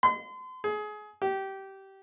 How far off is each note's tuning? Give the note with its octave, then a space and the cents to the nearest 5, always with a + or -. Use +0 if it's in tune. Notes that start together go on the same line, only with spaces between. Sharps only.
C6 -40
G#4 +25
G4 -20